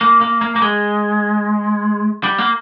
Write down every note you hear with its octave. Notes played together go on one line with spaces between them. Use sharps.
A#3
A#3
A#3
A#3
G#3
G3
A#3